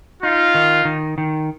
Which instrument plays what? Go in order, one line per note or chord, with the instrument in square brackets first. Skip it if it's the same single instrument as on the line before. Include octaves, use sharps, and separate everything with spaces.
[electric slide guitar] D#4 [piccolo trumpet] F4
[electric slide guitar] D#3
D#3
D#3